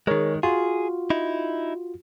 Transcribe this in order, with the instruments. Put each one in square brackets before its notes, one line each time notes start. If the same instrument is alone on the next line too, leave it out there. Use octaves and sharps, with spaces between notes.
[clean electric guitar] D#3 G#3 [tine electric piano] G#4 A#4 C#5
[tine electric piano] F4 F#4 [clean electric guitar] G#4
[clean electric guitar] D#4 E4